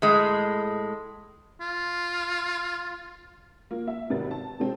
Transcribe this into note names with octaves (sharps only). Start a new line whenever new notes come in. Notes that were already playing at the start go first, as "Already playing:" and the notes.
A2 G#3
F4
A#3 F4
E5
G#1 C3 D#4 A#4 B4 A6
A5
C3 G#3 C4